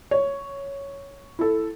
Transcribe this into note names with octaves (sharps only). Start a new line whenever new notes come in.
C#5
E4 A4